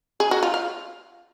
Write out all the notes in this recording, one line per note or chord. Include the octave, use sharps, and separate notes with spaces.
G#4
F#4
F4
F5